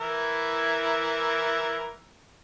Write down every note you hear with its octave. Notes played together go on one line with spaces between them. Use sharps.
E3 E4 A#4